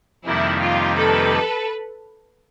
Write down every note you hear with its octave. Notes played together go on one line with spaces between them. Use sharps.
F2 C3 D#3 G3 A#3 E4
F4
A4 B4